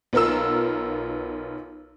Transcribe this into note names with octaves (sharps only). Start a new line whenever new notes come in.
B1 B3 F4 A#4 E6